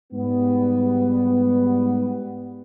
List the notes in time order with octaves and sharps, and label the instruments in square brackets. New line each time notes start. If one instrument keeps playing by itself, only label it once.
[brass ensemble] G#2 G3 B3